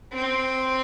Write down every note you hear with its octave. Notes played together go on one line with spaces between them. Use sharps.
C4